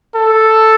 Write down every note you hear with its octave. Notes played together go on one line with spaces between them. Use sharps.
A4